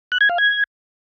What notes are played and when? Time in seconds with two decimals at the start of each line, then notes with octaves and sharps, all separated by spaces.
0.12 F#6
0.21 G#6
0.30 F5
0.38 G#6